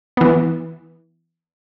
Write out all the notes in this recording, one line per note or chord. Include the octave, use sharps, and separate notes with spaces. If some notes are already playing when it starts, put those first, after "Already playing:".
E3 B3